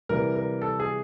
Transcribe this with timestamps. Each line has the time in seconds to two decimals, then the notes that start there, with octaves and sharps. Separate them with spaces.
0.09 C3 E3 G3 A#4
0.35 A#4
0.62 A4
0.80 G#4